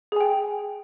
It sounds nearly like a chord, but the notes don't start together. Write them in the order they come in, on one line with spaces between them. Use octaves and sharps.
G#4 G#5 G5